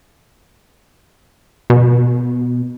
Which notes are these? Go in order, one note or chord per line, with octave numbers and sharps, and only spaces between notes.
B2